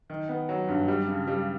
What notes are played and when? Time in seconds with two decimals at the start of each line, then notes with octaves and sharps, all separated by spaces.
0.10 D#3
0.29 B3
0.49 F#3
0.68 G2
0.88 G3
1.08 C#3
1.27 G3